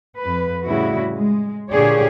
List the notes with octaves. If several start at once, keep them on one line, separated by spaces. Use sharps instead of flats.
F2 B4
A2 C#3 G3 E4 F#4
G#3
A#2 D3 G4 G#4 C#5 D5